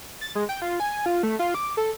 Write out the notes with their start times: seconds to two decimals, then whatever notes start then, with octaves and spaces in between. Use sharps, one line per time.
0.21 A6
0.35 G#3
0.49 G5
0.62 F4
0.80 G#5
1.06 F4
1.23 A3
1.39 F4
1.54 D6
1.77 A4